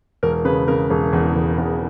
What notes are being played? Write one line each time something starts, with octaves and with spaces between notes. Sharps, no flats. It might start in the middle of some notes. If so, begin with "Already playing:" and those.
E1 A#4
C#3 B4
C#3 A#4
E1 G#4
E2
E1
E2